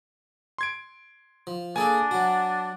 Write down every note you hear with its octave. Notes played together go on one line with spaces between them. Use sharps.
C6 G#6 D7
F3
A#3 D4 G#4 A4 G#5
F#3 F#4